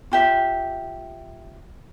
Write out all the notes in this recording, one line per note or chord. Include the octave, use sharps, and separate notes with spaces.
F4 G4 E5